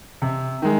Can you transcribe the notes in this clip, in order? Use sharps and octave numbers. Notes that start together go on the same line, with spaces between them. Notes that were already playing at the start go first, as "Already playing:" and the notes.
C3
D#3 G#3